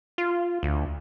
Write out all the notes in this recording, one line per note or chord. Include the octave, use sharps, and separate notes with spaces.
F4
D2